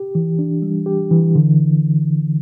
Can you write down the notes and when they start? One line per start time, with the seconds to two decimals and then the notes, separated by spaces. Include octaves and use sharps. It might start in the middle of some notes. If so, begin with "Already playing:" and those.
Already playing: G4
0.15 E3
0.39 D4
0.62 G3
0.86 G4
1.11 E3
1.35 D3